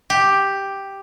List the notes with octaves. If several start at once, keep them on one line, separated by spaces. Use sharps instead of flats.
G4